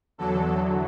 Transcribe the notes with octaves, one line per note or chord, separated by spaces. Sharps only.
E2 D3 F#3 A4